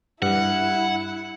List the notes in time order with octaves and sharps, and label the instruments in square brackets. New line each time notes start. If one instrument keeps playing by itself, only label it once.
[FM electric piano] G2 [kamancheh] E4 [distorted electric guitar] F#5